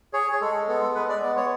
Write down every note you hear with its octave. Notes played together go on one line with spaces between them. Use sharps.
G#4 C#5
G#4
G#3 A4
B3 A4
G#3 B4
D5
B3 D5
C#5